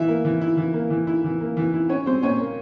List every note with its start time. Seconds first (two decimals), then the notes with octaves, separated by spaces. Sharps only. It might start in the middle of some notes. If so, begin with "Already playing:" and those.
Already playing: E3 E4 E5
0.08 A#3
0.25 E3
0.41 E4
0.57 E3
0.74 A#3
0.90 E3
1.07 E4
1.24 E3
1.41 A#3
1.57 E3
1.74 E4
1.89 C#4 C#5
2.06 G3 C4 C5
2.23 A#2 C#4 C#5
2.40 A#3